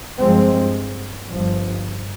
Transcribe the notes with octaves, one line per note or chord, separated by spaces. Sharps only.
G2 F3 G#3 C4
G1 G2 F3